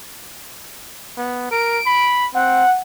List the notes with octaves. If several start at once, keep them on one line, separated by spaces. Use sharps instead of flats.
B3
A#4 D7
B5
C4 F#5